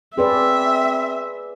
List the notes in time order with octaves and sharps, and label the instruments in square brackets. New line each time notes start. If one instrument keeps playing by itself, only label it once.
[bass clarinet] C4 [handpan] G#4 B4 D5 [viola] E5